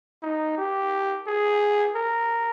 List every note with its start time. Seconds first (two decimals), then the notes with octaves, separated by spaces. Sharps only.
0.22 D#4
0.58 G4
1.27 G#4
1.96 A#4